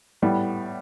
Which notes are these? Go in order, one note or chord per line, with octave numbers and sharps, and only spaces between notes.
A2 G3 B3